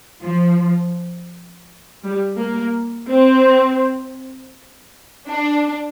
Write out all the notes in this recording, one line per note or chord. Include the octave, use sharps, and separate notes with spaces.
F3
G3
A#3
C4
D4